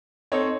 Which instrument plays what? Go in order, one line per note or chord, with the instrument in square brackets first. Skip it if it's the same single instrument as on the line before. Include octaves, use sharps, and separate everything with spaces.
[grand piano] C4 D#4 A4 C#5